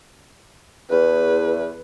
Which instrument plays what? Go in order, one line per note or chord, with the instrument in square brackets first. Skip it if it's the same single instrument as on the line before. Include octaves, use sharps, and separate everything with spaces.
[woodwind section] E2 [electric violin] B4